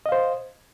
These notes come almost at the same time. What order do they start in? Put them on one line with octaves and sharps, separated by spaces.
D#5 F5 C5